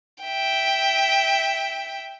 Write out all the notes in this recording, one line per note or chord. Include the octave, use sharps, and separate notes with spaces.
E5 G5